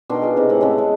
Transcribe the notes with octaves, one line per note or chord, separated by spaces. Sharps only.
B2 D#3 D4 C6
F4 G#4
C3 D#3 E3
A2 C4 F#5
C#3 G#3 B3 A4
G#3